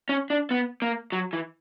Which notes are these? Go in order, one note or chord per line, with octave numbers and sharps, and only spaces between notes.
C#4
D4
B3
A#3
F#3
E3